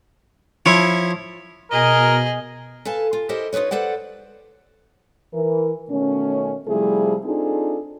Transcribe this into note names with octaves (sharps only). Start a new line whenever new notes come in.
F3 E4 C#5
B2 G#4 A#4 D#5
A4 B4 F5 G#5 A5
F4
E4 G4 A4 A#4 C5 D#5
D#4 F4 G#4 B4 C#5
A4 B4 C5 D5 F#5
E3 A#4
B2 D#3 A3 C#4
C3 F3 G3 A3 E4 G#4
C4 D4 D#4 F4 G#4 A4